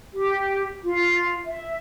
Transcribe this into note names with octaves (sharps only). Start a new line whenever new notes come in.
G4
F4
E5